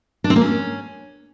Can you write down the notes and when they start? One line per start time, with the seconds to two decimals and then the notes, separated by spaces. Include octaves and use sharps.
0.24 D4
0.30 C4
0.36 A#3
0.42 C#4